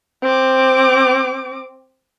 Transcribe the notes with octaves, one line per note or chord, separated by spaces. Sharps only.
C4 D6